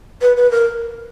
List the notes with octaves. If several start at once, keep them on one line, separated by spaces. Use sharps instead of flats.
B4
B4
A#4